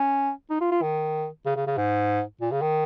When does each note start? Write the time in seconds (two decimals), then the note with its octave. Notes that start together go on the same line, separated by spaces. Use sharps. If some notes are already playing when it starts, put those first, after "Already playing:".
Already playing: C#4
0.50 D#4
0.61 F4
0.71 F4
0.82 D#3
1.46 C#3
1.56 C#3
1.67 C#3
1.77 G#2
2.41 A#2
2.51 C#3
2.62 D#3